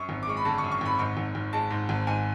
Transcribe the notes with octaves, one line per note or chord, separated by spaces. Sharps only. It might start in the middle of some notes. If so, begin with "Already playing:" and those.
Already playing: F#2 C#6
G#1
D6
G#3 C#6
B5
D3 A5
C#6
F#2
C#6
G#1 B5
G#2 C#6
G#1
G#1
G#3 A5
G#2
G#1
G#2 G#5